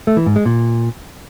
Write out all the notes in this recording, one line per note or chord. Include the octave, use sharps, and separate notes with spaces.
A3
E3
G#2
G#3
A#2